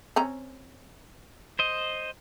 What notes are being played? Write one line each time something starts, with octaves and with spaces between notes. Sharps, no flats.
C4 C#4 A#5
C5 D#5